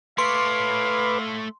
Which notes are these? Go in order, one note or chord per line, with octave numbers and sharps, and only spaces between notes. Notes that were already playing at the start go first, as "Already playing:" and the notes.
A3 B4 C#5 F5 B5 C6 D6